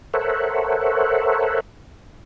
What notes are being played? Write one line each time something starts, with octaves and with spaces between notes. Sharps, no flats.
A4 A#4 C5 C#5 E5 F#5